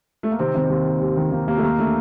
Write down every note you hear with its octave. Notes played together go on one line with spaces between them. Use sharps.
A3
A#3
C3 D#3 C4
C3 D#3 C4
D#2
D#2
D#2
D#3
D#3 A#3
D#2 A#3
A3
D#2 A#3
D3 A3